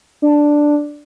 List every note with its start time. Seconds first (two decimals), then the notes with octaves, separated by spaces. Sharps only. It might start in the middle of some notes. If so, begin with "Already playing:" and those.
0.22 D4